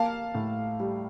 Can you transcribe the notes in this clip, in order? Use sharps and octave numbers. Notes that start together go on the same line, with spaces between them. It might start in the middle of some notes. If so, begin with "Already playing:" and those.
Already playing: A#3 F5 A5
A2
G3